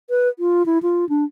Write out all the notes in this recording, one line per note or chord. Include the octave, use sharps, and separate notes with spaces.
B4
F4
E4
F4
D4